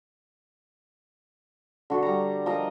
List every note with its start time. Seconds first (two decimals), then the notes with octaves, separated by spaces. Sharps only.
1.90 D3 F#4
2.03 G3 A#5
2.46 F3 A#4 D#5 A#5